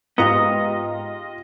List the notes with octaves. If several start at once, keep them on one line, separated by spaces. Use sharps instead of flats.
G#2 B3 F4 G4 D#5 A#5